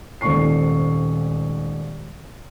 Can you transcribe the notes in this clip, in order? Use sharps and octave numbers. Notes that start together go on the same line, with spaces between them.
D#1 G#1 A#2 C#6 C7